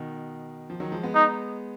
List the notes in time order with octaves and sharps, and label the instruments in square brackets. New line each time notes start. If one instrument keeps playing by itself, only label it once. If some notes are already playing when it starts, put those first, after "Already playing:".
Already playing: [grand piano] B2 D#3
F3
D#3 F#3
F3 G#3
G#3 B3
[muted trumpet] D#4